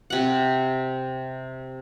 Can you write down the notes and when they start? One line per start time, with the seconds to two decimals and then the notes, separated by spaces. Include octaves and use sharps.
0.10 C3 F#5